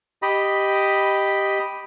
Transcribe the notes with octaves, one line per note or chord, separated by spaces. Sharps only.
G4 D#5 B5